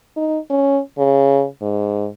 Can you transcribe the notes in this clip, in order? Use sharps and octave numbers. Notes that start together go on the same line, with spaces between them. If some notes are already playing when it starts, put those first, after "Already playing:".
D#4
C#4
C#3
G#2